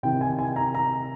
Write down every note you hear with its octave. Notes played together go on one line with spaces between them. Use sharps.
C3 D#3 G5
G#5
G#5
A#5
A#5